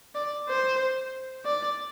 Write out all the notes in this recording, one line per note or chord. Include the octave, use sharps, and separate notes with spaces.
D5
C5
D5